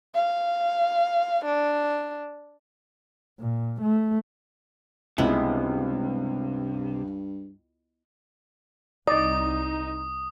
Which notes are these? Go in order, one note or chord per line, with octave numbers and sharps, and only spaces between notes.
F5
D4
A#2
A3
C#2 G2 C3 G#3 B3 E4
C2 D#4 D5 D#5 D#6